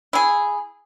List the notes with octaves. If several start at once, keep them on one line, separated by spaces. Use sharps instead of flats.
E4 G#4